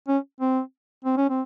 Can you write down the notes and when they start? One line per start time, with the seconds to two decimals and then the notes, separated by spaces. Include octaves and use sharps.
0.08 C#4
0.40 C4
1.05 C4
1.17 C#4
1.30 C4